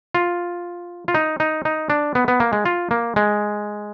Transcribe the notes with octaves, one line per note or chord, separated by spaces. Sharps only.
F4
F4
D#4
D#4
D#4
D4
B3
B3
A#3
G#3
F4
A#3
G#3